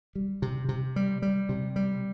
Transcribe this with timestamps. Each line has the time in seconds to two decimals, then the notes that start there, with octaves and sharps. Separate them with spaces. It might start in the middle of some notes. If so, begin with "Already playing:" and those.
0.15 G3
0.42 C3
0.69 C3
0.96 G3
1.22 G3
1.49 C3
1.76 G3